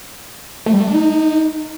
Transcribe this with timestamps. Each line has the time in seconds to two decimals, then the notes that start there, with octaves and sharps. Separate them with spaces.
0.66 A3
0.73 G3
0.80 A3
0.87 D4
0.94 D#4